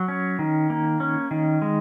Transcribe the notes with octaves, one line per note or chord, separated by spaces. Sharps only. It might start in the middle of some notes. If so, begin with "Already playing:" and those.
Already playing: F#3
C#4
D#3
A#3
C#4
D#3
G#3